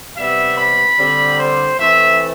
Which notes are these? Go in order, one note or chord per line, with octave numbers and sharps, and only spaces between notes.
C3 G3 B3 E5
B5
D3 G3 C4
C5
E3 A3 C4 E5